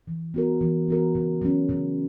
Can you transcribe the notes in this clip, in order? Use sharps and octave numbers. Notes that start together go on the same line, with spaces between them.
E3
B3 F#4 A#4
E3
B3 F#4 A#4
C#3
F#3 C#4
C#3